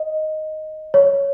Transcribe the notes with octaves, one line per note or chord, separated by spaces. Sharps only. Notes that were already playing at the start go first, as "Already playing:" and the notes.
Already playing: D#5
C#5